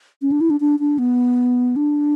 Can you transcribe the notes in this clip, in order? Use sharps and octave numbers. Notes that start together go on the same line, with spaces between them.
C#4
D4
E4
D4
D4
D4
B3
D4